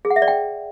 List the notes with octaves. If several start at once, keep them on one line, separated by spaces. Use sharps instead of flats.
G#4
F#5
E5
D5
G5